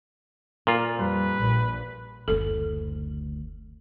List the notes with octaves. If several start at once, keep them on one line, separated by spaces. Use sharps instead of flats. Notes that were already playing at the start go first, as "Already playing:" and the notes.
A#2 F4 A#4
F2 G3 B4
A#1 A#2
F#1 D2 A4